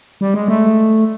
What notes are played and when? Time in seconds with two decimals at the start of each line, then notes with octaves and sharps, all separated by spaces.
0.21 G3
0.34 G#3
0.48 A3